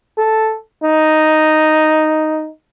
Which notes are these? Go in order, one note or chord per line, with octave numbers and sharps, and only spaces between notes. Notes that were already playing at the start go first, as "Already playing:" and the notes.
A4
D#4